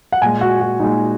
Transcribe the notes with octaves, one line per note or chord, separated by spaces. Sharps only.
F#5
A#2 G#3 G#5
F#4
F#4
A#2 G#3 D#4